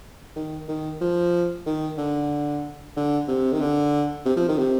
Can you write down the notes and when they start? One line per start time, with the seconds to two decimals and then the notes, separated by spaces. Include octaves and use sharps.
0.36 D#3
0.68 D#3
1.01 F3
1.66 D#3
1.97 D3
2.96 D3
3.28 C3
3.52 D#3
3.61 D3
4.25 C3
4.37 F3
4.48 D#3
4.58 C3